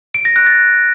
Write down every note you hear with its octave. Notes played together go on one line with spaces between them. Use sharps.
D7
A#6
F#6
A6